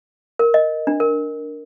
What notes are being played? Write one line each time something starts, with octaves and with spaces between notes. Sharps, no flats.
A#4
D#5
D4
A#4